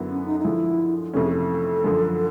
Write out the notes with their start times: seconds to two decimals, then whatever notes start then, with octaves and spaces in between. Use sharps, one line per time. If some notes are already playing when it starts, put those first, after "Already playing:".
Already playing: F#2 D3 F#3 B3 E4
0.09 C#4
0.26 D#4
0.40 D#4
0.44 D3 F3 G#3 E4
1.14 F2 C3 E3 A3 C#4 A4
1.23 G#4
1.31 A4
1.84 F#2 D3 F3